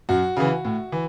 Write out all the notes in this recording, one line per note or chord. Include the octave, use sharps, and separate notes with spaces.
F#2 F#4
C#3 E3
A2
E3